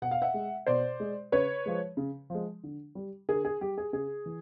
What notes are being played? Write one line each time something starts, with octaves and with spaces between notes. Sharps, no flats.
B2 F#5
F5
E5 F#5
G#3
B2 C5 D5
G#3
C#3 B4 C#5
F3 G#3
C#3
F3 G#3
D3
G3
D3 G#4 A#4
G#4
G3 G4
G#4
C#3 G#4
E3